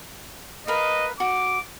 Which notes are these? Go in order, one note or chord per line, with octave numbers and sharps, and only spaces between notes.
A#4 B4 D#5 F5
F#4 D6